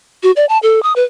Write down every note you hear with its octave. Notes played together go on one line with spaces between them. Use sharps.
F#4
D5
A5
A4
D#6
B4